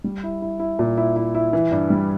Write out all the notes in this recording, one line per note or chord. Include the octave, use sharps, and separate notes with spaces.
G3
E4
E4
E4
A#2
E4
E4
E4
E3
G2
G3